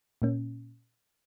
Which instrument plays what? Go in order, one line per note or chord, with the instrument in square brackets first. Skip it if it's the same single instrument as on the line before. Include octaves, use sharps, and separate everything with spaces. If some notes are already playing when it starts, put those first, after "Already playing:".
[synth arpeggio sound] A#2 A#3 C#4